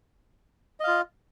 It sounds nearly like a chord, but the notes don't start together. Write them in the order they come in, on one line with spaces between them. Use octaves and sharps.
D#5 F5 F4